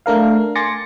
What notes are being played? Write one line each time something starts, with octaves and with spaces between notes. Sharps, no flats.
A3 D4 A#4 F5
G#5 C6 D6 A6 A#6 C#7